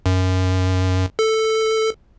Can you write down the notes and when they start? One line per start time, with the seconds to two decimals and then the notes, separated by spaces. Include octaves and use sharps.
0.06 F#2
1.19 A4